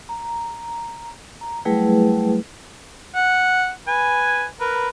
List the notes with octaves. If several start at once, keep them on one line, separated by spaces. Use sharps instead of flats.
A#5
A#5
F#3 G3 A3 E4 G#4 B4
F#5
B4 G#5
A#4 B4